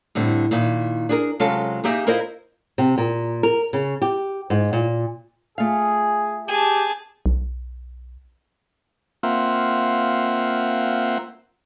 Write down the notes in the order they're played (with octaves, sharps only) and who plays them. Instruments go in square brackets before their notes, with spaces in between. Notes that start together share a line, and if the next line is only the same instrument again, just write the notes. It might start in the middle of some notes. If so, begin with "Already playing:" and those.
[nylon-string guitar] A2 D3 G3 C4
A#2 D#3 D#4 E4
D4 G#4 A#4
C3 F#3 G#3 C#4 F4 A4
A#3 D#4 G4 G#4 E5
E4 F4 A#4 C5 D#5
C3
A#2
A#4
C#3
G4
G#2
A#2
[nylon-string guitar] A3 F4 F5 [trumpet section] G#4
[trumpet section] G4 [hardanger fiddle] G#4 A5
[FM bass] B1
[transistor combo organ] A#3 C4 F4 E5 F#5